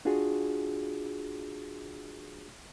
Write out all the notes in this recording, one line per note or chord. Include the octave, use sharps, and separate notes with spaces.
D4 F4 F#4 G#4